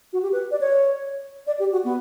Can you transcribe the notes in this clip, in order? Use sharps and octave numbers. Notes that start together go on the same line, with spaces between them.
F#4
G4
B4
D5
C#5
D5
G4
F#4
B3